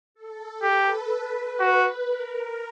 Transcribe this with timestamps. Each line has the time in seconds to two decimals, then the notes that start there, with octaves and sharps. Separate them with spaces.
0.14 A4
0.62 G4 B4
1.60 F#4
2.08 A#4